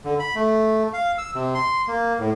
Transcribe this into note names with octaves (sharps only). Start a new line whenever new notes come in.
D3
B5
A3
F5
E6
C3
C6
A#3
A2